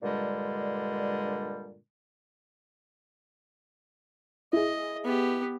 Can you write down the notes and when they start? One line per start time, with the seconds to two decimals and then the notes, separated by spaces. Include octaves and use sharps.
0.02 G2 A#2 D3 G3 G#3
4.53 E4 G#4 D#5
5.04 B3 G4